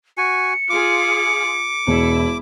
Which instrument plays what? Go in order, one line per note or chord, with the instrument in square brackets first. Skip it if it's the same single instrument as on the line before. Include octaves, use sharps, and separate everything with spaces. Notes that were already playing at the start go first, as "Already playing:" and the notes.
[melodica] F#4 G#5 [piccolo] C#7
[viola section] F4 G#4 [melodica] D6
[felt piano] E1 [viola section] E4